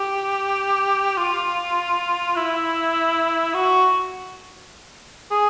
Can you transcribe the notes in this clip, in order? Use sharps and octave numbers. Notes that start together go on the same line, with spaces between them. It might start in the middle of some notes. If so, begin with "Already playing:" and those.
Already playing: G4
F4
E4
F#4
G#4